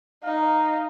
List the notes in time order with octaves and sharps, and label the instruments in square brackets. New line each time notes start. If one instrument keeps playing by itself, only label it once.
[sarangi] D#4 [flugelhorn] F5